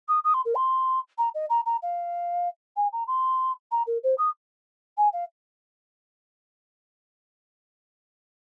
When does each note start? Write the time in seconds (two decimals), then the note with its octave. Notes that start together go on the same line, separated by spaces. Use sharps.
0.08 D#6
0.24 D#6
0.34 C6
0.45 A#4
0.55 C6
1.18 A#5
1.34 D#5
1.50 A#5
1.66 A#5
1.82 F5
2.76 G#5
2.93 A#5
3.08 C6
3.72 A#5
3.87 A#4
4.03 C5
4.18 D#6
4.97 G#5
5.13 F5